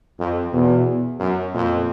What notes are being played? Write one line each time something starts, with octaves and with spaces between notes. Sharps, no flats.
F2
E2 B2
F#2
F2 A#2